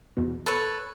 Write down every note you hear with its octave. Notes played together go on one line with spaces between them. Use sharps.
E2 B2
A4 B4 C#5